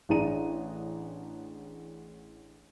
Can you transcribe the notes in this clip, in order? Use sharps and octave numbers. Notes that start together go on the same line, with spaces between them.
A1 D4 G#4 A#5 D#7